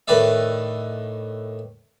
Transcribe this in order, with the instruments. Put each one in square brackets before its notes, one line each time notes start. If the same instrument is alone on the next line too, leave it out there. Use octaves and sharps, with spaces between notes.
[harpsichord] A2 D#3 B4 D5 E5